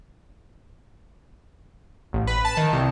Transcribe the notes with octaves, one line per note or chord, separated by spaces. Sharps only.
A1
B4
A5
D#3
C2